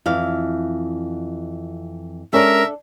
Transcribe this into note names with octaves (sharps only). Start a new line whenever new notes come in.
F2 E3 F5
G#3 C#4 D4 A4 A#4 E5